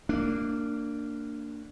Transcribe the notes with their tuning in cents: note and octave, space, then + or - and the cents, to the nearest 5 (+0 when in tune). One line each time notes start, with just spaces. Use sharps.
A#3 -20 D4 +0